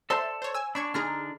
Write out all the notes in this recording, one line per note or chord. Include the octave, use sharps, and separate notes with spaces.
A4 C5 D5 E5 A5 C6
C5 C#5
G#5 E6
D4 B5 C#6 G#6
D3 D4 D#4 G#4 A#5 F6